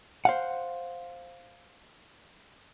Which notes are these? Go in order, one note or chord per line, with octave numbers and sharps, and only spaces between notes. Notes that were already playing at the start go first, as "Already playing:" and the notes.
C5 F5 F#5